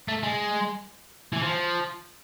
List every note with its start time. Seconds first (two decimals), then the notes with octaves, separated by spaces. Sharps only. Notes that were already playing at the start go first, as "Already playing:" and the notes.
0.08 A3
0.23 G#3
1.33 E3
1.42 F3